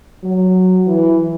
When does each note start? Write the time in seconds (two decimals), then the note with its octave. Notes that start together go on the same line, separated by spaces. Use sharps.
0.24 F#3
0.87 E3